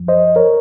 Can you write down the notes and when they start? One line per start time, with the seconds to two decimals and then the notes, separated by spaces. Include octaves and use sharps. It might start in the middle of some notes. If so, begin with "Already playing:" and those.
Already playing: F#2 F3
0.08 C5 D#5
0.36 A#4 C#5